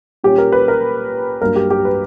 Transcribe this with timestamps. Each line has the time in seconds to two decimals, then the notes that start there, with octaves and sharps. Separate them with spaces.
0.24 A#2 G3 C#4 G4
0.38 A#4
0.52 B4
0.68 A#4
1.42 G2 F#3 A#3 D4 A#4
1.56 G4
1.70 G4
1.85 B4